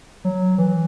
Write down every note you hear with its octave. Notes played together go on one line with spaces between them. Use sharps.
F#3
E3